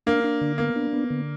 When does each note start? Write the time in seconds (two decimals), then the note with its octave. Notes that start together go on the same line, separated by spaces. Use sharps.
0.07 A#3 D4
0.24 D4
0.41 D3
0.58 A#3 B3
0.76 D4
0.93 B3
1.10 D3